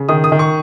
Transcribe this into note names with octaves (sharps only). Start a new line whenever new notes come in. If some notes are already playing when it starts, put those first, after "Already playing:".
Already playing: C#3
D#3 D#6
D#6
D#3
C#6